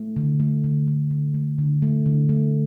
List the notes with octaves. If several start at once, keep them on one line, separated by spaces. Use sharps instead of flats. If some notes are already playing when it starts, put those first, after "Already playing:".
Already playing: A3
D3
A3
D3
A3
D3
A3
D3
A3
D3
A3